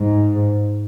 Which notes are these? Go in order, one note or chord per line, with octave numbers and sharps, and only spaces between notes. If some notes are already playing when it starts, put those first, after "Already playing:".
Already playing: G#2